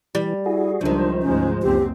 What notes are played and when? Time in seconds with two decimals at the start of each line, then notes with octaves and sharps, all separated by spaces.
0.15 E3 G3
0.46 E4 F#4 G#4
0.81 C#2 F#2 D#3 F3 G3 D4 C5
1.22 D2 G#2 G#3 C#4
1.62 F#1 C#2 C4 G4